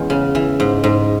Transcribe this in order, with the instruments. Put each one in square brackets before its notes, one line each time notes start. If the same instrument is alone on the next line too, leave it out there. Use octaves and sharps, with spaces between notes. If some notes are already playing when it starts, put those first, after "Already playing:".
Already playing: [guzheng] E2 G#3 B3 C#4
C#3
E3
G#2
G#2